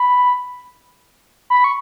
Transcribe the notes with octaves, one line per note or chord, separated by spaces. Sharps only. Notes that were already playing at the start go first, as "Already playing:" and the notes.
Already playing: B5
B5
C#6